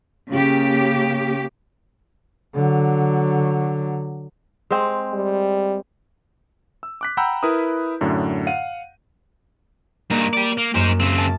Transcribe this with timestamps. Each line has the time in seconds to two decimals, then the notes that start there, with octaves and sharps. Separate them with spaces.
0.33 C#3 A#3 G4
2.55 D3 F#3
4.71 G#3 C4
5.14 G3
6.83 E6
7.01 D6 F#6 B6
7.17 F#5 G5 A#5 B5 E6 G6
7.43 E4 A#4 B4 D#6
8.01 F#2 A2 D3
8.47 F5 F#5 D#7
10.10 G2 A#3 D#4
10.33 G4 D5
10.58 A#3
10.75 F#2 D#4 C5
11.00 C#3 C4
11.18 A5